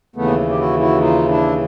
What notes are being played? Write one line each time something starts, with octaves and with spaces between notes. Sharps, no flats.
D#2 C#3 E3 A3 B3
G4
E4 F#4
E4 F#4
D#4 F4
D4 E4